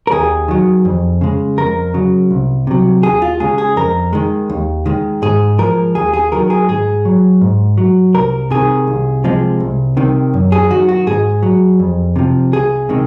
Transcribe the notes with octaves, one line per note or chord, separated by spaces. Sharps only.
A#4
D#2 G#4
D#3 F#3
F2
C#3 G#3
F2 A#4
C#3 F#3
C2
C3 F#3
D#2 G#4
F4
C#3 G#3 G#4
G#4
F2 A#4
D#3 G#3
D#2
D#3 G#3
G#2 G#4
F3 G#3 A#4
D#2 G#4
G#4
D#3 F#3 A#4
G#4
G#2 G#4
F#3
G#2
F#3
C2 A#4
C3 D#3 G#4
C2
C3 F3 G#3
C2
C3 D#3
F#2
G#4
D#3 F#3 F#4
F#4
G#2 G#4
F#3
F2
C3 F3
C2 G#4
C3 D#3 G#3